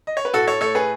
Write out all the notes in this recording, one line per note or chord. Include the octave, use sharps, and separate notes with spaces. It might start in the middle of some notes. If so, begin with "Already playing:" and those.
D#5
C#5
B4
A2 F#4 A4
A4 C#5
A3 A4 C#5
G#4 B4